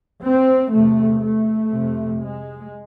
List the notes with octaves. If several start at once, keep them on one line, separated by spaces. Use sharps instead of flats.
C4
E2 C3 A3
A3
F2 C3
G#3